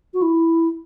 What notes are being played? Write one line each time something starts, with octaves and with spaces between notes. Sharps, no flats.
F#4
E4